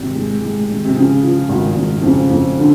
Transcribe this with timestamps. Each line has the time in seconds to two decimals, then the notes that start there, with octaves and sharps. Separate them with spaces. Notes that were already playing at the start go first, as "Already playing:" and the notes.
Already playing: G#1 C3
0.15 G#3
0.42 G#3
0.70 G#1
0.85 C3
0.96 C#3 F3
1.23 F3
1.49 G#1
1.76 G#1
1.98 C3
2.03 F2 C#3
2.30 F2
2.57 D3